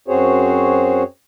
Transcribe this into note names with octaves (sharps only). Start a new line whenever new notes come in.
F#2 C4 F#4 G#4 C5 C#5